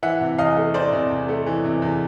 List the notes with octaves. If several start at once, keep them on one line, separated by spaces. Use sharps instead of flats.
E3 E5 F#5
C3
E2 D#5 F5
A3
E3 C5 D5
C3
E2
A3
E3
C3
E2